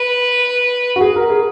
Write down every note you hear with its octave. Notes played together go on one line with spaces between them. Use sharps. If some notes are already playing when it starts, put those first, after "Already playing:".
Already playing: B4
F#4
G#4
A#4
G#4